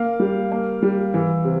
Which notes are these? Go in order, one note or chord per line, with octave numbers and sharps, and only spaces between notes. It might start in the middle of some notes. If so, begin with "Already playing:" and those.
Already playing: A#3 F5
G3
A#3
G3
E3
C3